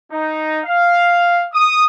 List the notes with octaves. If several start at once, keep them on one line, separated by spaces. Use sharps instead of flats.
D#4
F5
D#6